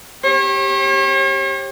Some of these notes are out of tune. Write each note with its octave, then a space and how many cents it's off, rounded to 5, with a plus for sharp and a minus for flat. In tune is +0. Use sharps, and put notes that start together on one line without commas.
G4 +0 C#5 -40